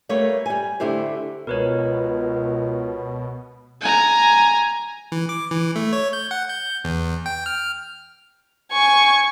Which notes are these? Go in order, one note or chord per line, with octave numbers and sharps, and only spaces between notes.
G3 A3 A#3 B4 C#5
G3 G#5
D3 A3 E4 G4 C5
C#2 B2 A#4 B4 C#5
G#5 A#5
E3
D6
E3
A3
C#5
G6
F#5
G6
E2
G5
F6
G#5 C#6